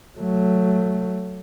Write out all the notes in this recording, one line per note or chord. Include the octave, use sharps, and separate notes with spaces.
F#3 A3